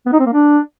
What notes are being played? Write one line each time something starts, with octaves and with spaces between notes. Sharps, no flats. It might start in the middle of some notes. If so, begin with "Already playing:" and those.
B3
D#4
C4
A#3
D4